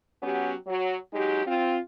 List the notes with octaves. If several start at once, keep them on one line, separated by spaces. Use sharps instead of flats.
F#3 B3 C#4 G4
F#3
F#3 G#3 D#4 G4
C4 F4